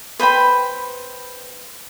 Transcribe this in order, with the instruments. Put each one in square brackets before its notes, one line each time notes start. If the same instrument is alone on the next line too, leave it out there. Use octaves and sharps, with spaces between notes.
[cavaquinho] B4 C5 G5 B5